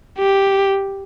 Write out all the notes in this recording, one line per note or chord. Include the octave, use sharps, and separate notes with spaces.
G4